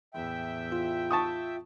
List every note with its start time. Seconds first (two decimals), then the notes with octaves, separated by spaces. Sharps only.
0.14 E2 A2 E5 G5
0.72 F4
1.11 A5 C#6 D#6